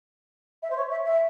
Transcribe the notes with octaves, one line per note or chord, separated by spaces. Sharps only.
E5
C5
C#5
E5
E5